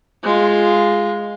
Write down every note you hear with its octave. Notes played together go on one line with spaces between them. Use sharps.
G#3 F4